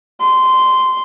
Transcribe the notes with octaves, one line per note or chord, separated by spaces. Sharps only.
C6